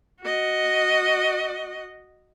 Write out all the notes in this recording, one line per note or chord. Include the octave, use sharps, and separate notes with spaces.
F#4 D#5